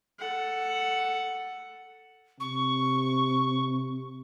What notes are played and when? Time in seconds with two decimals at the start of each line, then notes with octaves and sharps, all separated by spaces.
0.19 A4 F#5
2.40 C3 C#6